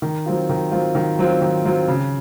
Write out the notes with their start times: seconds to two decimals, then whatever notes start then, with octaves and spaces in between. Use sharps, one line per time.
0.02 D#3
0.26 F#3 C4 F4
0.49 D#3
0.72 F#3 C4 F4
0.95 D#3
1.19 F#3 C4 F4
1.41 D#3
1.65 F#3 C4 F4
1.88 C#3